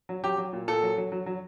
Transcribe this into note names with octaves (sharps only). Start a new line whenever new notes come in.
F#3
F#3 G4
F#3
A#2
A#2 A4
F#3
F#3
F#3
F#3